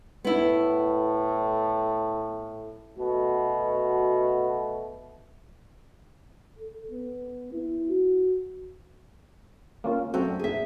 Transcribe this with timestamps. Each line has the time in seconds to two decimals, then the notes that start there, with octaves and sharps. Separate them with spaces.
0.25 A2 B3 E4
2.97 B2 A3 F#4
6.59 A4
6.91 B3
7.53 E4
7.90 F#4
9.84 A#3 C#4 F4
10.14 F#2 A3 C4 F#4
10.39 G#4 E5